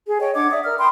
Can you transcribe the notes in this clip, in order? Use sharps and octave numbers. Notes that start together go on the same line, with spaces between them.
G#4
C#5 D#5 G5
D4 F#5 D6 G#6
D5 E5 D#6
A#4 F6
G5 B5 C6 D#6